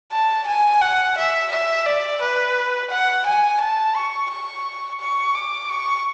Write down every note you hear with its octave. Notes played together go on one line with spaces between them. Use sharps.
A5
G#5
F#5
E5
E5
D5
B4
F#5
G#5
A5
C#6
C#6
C#6
D6
C#6